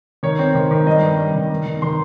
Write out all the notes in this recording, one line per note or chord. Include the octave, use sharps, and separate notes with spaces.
D#3 C#5
C4
D#3
D#3
G3 D#5
G2
G3
D#3
D#3
D#3
D#3 C6